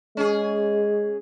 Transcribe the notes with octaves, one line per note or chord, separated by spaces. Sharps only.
G#3 C#4 G#4